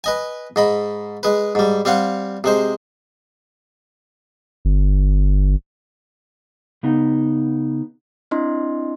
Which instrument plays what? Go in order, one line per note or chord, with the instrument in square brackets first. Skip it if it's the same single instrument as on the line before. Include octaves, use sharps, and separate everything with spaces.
[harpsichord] B4 D#5 G#5
G#2 D#5 B5
G#3 B4
G#2 G3
G3 C4 F5 F#5
C3 G#3 C5
[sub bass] G1
[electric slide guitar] C#3 B3 D#4
[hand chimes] C4 D4 E4 D#5 C6